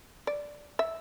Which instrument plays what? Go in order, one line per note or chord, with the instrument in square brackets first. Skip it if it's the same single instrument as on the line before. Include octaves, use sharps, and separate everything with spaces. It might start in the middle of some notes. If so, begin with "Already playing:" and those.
[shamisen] D5
E5